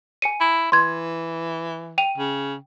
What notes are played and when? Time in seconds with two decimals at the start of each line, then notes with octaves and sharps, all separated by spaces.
0.22 G#5 C#7 D#7
0.41 E4
0.72 E3 C6 G#6
1.98 G5 D#7 F7
2.18 C#3